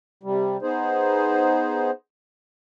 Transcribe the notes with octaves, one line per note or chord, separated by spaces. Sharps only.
C3 G3
B3 D#4 G#4 C5